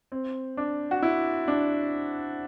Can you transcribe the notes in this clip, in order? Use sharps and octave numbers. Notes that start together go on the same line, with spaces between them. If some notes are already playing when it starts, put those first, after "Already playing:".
C4
D4
F#4
E4
D4